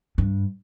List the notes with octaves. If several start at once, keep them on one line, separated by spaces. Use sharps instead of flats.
G2